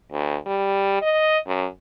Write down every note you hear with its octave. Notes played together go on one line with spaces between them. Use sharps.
D2
G3
D#5
F#2